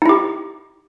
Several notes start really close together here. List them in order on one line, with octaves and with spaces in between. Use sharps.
D#4 E4 G4